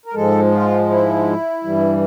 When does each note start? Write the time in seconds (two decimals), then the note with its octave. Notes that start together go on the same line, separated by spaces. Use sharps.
0.06 A#4
0.14 G#2 F3 G#3 A4
0.52 F4
0.89 E4
1.64 G2 E3 G3